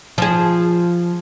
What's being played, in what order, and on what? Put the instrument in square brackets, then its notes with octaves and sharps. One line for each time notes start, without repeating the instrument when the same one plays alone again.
[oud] F3 G#4